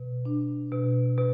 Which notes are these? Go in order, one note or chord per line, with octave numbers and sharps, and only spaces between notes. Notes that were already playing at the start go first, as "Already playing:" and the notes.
Already playing: B2
D4
B2
B2